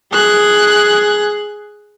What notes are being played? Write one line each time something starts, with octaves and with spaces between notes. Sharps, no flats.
G#4 F#6